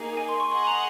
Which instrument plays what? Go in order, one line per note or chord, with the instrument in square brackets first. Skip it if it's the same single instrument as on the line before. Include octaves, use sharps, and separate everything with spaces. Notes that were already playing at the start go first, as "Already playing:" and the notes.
Already playing: [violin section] A#3 D#4 G#4
[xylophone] G#5
C6
C#6
[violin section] G#4 D#5 F#5 [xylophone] C6
[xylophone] A#5